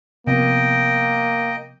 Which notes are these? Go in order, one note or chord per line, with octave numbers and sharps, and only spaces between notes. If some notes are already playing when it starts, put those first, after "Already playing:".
C3 F3 A#3 B3 D#5 G5